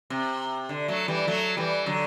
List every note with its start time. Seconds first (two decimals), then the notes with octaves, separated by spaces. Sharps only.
0.10 C3
0.69 D3
0.88 F#3 A3
1.08 E3 G3
1.27 F#3 A3
1.57 E3 G3
1.86 D3 F#3